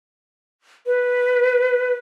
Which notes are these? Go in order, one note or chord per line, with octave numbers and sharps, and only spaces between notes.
B4